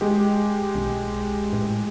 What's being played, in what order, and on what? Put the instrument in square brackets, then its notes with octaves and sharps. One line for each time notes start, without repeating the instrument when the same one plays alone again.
[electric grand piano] G#3 G4
[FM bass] B1
A2